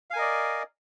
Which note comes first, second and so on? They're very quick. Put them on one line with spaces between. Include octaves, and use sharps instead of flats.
F5 G#5 A#4 D#5 D5